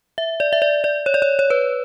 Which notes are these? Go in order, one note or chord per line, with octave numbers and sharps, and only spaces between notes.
E5
D5
E5
D5
D5
C#5
D5
C#5
C#5
B4